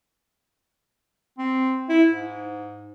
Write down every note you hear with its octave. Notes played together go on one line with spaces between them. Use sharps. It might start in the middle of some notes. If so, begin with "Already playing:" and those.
C4
E4
G#2